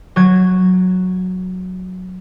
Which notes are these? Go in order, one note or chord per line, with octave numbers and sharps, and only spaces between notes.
F#3 G#6